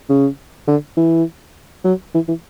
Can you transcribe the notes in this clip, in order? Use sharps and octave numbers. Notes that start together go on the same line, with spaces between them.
C#3
D3
E3
F#3
E3
E3